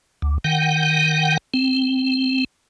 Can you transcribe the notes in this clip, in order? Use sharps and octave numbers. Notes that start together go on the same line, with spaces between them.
D2
D#3 F#5 G5
C4